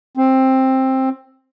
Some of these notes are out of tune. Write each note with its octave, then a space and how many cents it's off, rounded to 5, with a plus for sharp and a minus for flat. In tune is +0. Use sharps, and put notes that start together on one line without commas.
C4 +10